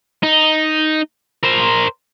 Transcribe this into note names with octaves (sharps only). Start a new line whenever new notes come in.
D#4
A#4 C5